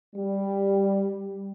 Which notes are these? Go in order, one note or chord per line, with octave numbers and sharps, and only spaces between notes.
G3